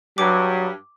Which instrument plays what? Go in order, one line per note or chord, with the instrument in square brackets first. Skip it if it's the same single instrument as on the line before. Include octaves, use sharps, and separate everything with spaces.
[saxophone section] G2 [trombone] F#3 [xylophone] D6